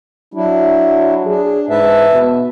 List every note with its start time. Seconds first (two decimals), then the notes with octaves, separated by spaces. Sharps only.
0.34 F#3 D4 E4
1.26 D4 G#4
1.69 G#2 B4 E5 A5
2.12 B2